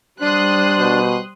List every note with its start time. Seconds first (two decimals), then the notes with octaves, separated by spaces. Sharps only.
0.21 G3 D4 C5 C6 D#6 F#6
0.79 B2